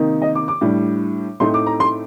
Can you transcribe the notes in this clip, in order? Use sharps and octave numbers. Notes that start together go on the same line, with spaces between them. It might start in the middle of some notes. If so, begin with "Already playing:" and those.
Already playing: C3 D#3 A#3 D#4
D#5
D6
D6
A2 G3 D4
A2 A3 C4 D#4 C6
D6
A#5
C6